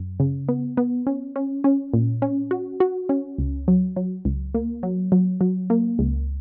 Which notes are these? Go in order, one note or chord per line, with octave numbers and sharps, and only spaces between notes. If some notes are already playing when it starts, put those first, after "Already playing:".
Already playing: F#2
C#3
B3
B3
C#4
C#4
C#4
A#2
C#4
F#4
F#4
C#4
C#2
F#3
F#3
C#2
A#3
F#3
F#3
F#3
A#3
C#2